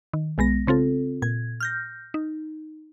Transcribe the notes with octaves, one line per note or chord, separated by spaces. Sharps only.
D#3
B1 G#3 B3 A#6
C#3 C4 F4 A4
A#2 G#6
F6 G6 A#6
D#4